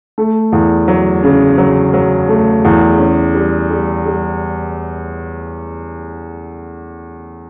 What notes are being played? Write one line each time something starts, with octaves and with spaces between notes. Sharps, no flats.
A3
E2
F#3
C#3
F#3
F#3
A3
E2
C#4
G3
G3
G3